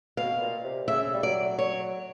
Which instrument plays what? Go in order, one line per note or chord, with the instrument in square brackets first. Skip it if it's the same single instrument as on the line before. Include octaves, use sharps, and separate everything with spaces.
[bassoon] B2 [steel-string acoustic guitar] F5
[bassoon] A#2
C3
[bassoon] C#3 [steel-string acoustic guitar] E5
[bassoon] G3
[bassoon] F#3 [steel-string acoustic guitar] D5
[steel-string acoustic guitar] C#5